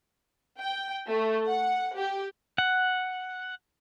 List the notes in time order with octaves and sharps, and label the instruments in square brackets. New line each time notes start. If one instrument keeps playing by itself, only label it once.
[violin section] G5
A3
F#5
G4
[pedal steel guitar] F#5